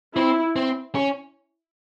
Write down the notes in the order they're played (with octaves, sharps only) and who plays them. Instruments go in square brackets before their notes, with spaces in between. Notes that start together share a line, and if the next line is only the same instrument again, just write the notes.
[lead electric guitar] C4 [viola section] E4
[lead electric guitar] C4
C#4